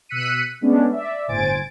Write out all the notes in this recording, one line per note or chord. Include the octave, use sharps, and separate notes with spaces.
B2 E6 F#6 B6 C#7 D#7
G#3 A3 B3 C#4 D4
D5 E5
G1 A2 C5 G#5 A6 D7